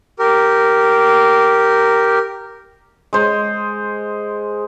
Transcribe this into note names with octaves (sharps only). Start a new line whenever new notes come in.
G4 A#4
G#3 C5